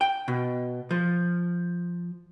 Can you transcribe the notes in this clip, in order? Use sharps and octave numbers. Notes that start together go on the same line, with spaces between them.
G5
B2
F3